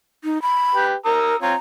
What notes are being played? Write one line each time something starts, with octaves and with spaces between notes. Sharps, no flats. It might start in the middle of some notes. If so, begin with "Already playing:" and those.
D#4
B5
G4 B4
A#4 A#5 D#6 E6
C4 F4 C#5 A#5